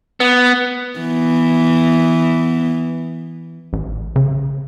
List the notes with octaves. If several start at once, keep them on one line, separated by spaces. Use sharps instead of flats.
B3
E3 B3
A1
C#3